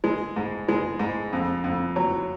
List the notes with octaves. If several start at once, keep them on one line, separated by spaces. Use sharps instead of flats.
G#3
G#2
G#3
G#2
F2
F2
F#3